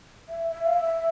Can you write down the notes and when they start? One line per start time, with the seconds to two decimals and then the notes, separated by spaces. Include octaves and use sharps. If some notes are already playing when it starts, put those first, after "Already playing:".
0.29 E5
0.51 E5
0.66 F5
0.73 E5